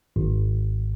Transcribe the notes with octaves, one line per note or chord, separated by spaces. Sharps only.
G#1